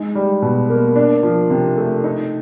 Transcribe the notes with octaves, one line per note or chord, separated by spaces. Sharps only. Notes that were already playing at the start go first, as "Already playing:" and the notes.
Already playing: G#3 D#4
G3
B2
A#3
D4
F3
C3
A3
D#4